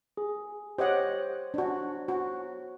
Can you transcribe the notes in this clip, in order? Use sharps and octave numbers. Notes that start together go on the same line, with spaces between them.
G#4
G4 C5 C#5 D#5 F#5
D4 F#4
F#4